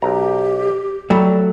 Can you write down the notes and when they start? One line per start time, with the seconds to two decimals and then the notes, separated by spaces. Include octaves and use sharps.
0.02 B1 G4 A#5
1.10 F#3 G3 A3